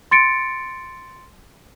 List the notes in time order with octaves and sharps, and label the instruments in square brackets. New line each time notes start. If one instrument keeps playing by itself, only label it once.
[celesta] C6 A6 C#7 D7